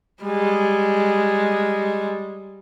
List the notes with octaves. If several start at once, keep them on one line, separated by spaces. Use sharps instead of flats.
G3 G#3